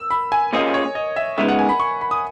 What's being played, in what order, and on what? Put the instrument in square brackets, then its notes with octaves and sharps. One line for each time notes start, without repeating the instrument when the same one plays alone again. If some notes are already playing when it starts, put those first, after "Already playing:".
Already playing: [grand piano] E6
B5
G#5
[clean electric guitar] A#2 A#3 C#4 G#4 [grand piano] D#5
[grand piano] C#5
D#5
E5
[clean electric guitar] C#3 G#3 B3 D#4 [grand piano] E5
[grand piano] F#5
G#5
B5
C#6
B5
D#6